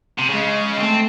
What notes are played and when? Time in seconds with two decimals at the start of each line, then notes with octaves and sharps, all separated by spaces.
0.18 C3
0.29 C#3 G#3
0.77 A3 C4